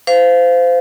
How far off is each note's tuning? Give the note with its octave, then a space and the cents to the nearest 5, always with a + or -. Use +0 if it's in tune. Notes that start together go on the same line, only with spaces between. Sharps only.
C5 -25 F5 +0